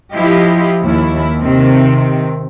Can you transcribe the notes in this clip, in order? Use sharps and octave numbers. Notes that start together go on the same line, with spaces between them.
F3 E4 F4 G4 D#5
D#2 E4
C3 D#3 C4